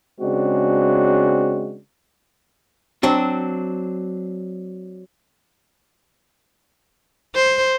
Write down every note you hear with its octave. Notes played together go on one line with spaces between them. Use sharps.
C#3 G#3 C4 D4 F#4
F#3 C4 D4
C5